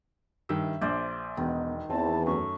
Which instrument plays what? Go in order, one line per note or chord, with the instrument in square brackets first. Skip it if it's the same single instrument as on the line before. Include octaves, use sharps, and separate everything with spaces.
[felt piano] G2 D#3 [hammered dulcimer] E5
[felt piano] A#1 [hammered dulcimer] C5 D5
[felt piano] E1 [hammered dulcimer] D#3 [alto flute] B3
[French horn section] E2 [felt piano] C4 [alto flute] A5
[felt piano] F#2 A3 [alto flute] C#6